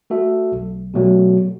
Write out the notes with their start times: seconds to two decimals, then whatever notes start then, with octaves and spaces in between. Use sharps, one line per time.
0.10 A3 F#4 A4 E5
0.52 B1
0.94 B2 F#3 A3 F#4